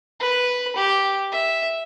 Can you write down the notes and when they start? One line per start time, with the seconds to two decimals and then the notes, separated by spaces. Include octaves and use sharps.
0.20 B4
0.76 G4
1.32 E5